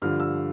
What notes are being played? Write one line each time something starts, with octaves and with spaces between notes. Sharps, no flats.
G2 D3 F3 F6
E6